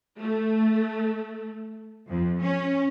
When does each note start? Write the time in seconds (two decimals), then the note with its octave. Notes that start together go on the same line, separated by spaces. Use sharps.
0.20 A3
2.10 F2
2.42 C#4